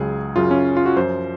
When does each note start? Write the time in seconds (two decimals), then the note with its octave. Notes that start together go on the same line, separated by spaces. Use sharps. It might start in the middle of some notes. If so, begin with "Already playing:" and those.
Already playing: C#2 C#3 F#3 G#4
0.36 F#2 C#3 F#3 F4
0.51 C#4
0.77 F4
0.86 F#4
0.97 F#2 F3 C5